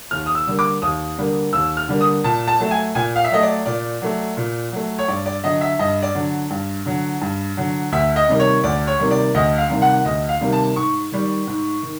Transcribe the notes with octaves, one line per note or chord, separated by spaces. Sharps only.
D#2 F6
D#6
E6
D3 G3 A#3
D6
D#2 D#6
D3 G3 A#3
D#2 E6
F6
D3 G3 A#3
D#6
A#2 A5
A5
F#3 A3
G#5
A#2 G#5
F5
E5
F#3 A3 D#5
D5
A#2 D5
F#3 A3
A#2
F#3 A3
C#5
G2 D5
D5
D3 F#3 D#5
E5
G2 D#5
D5
D3 F#3
G2
D3 F#3
G2
D3 F#3
D2 E5
D#5
C3 D#3 G3 A#3
C#5
D2 D5
C#5
C3 D#3 G3 A#3
D5
D2 D#5
F5
C3 D#3 G3 A#3
F#5
D2 D#5
F5
C3 D#3 G3 A#3
A5
G#2 C#6
D#3 G3
G#2
D#3